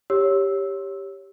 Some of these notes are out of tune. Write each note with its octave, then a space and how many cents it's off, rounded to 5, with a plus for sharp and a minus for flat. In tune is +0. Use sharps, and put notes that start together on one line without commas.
G4 +5 C#5 +0 E6 -10